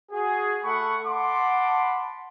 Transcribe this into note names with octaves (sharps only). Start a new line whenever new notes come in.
F#4 G#4
A3 A4 F#5 B5 C#6
F#5 A5 B5 C6 D6